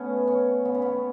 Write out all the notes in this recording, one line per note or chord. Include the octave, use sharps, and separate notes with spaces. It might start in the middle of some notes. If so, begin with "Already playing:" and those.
Already playing: A3 B3 C#4
C#4
B3
C#4
B3